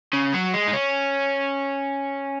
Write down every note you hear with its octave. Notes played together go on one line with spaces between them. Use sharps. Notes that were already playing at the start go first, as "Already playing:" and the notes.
C#3
F#3
G#3
D#4
C#4